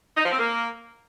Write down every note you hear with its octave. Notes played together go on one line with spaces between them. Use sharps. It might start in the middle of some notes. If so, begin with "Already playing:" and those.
D#4
F3
C4
A#3